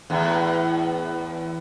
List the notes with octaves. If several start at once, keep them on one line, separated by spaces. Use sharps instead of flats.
E2 A2